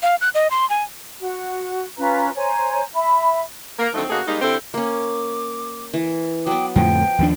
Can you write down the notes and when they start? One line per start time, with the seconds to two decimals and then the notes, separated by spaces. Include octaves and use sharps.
0.03 F5
0.21 F#6
0.35 D#5
0.51 C6
0.70 G#5
1.20 F#4
1.97 C#4 F4 B4 A#5
2.36 C5 C#5 G#5 A#5
2.93 E5 B5
3.79 A#3 A#4
3.94 D3 F3 F#3 A3 C4 D#4
4.10 C#3 A3 A#3 D#4 F#4 G#4
4.27 G3 G#3 A#3 D#4
4.42 D3 C4 E4 G4 A4 C5
4.74 A#3 C#4 D6
5.94 E3
6.47 F#3 B3 G5 D6 D#6
6.76 F2 A2 D3 F3 G5
7.18 D#2 F3 D4